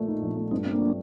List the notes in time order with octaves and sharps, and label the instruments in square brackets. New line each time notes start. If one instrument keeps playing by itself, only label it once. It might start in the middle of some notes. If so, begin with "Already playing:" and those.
Already playing: [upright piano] A#1 A#2 A3
D#4
A#1
A3
[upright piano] G2 [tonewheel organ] C4 D#4
[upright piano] C4
[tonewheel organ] A#3 D4
[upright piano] F#3